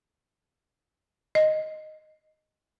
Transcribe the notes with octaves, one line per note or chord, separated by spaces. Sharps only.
D#5